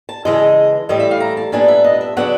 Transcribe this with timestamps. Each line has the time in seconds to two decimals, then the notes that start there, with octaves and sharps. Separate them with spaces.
0.09 A5
0.25 C#3 E3 G#3 D#5
0.89 A2 E3 G3 D#5
1.00 E5
1.11 F5
1.20 A#5
1.37 A5
1.52 A#2 G3 B3 D4 G#5
1.68 E5
1.84 D#5
2.01 E5
2.17 C#3 F#3 B3 D4 F#5